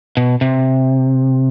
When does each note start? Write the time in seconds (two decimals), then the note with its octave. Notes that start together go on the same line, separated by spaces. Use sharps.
0.17 B2
0.41 C3